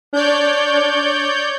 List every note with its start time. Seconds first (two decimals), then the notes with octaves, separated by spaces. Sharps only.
0.13 D4 C#5 D5 G6